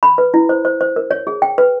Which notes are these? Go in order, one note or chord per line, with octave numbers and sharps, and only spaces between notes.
B5
B4
E4
C5
C5
C5
A#4
C#5
G#4
G5
B4